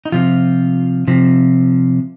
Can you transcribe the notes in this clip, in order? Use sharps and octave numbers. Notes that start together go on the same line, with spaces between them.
D#4
C3 F3 F4
C3 F3